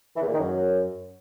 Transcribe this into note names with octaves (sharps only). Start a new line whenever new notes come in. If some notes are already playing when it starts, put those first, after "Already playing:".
E3
E2
A#2
D#3
F#2